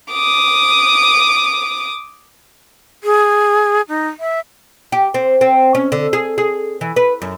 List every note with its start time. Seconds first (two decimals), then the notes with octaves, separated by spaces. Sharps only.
0.12 D6 D#6
3.04 G#4
3.88 D#4
4.20 E5
4.92 G4
5.14 C4
5.41 C4
5.75 C#4
5.92 D3
6.13 G#4
6.38 G#4
6.81 E3
6.96 B4
7.22 F#2